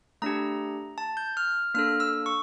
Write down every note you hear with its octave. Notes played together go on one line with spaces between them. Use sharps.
A3 D4 G4 A#5
A5
G6
F6
A#3 D4 A4 F6
E6
C#6